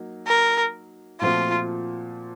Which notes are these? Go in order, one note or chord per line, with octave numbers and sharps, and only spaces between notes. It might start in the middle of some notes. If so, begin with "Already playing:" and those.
Already playing: F#3 A#3 D#4
A#4
A#2 F3 A3 C4 F4 F#4